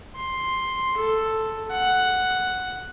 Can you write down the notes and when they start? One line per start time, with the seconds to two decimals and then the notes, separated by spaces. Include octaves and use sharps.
0.16 C6
0.97 A4
1.71 F#5